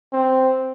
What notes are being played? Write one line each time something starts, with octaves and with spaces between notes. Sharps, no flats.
C4